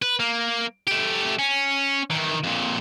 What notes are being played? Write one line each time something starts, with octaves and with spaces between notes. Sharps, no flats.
B4
A#3
A3 G4
C#4
D#3 E3
F2 A#2